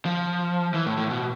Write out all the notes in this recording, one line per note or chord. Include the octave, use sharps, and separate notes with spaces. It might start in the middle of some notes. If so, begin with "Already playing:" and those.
F3
E3
A2
A2
B2